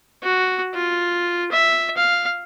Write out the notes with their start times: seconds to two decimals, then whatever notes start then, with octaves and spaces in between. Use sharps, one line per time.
0.23 F#4
0.74 F4
1.51 E5
1.97 F5